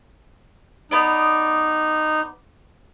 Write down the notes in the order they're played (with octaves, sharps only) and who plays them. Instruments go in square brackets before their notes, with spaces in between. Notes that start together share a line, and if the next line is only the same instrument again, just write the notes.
[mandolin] B3 D5 [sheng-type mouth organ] D#4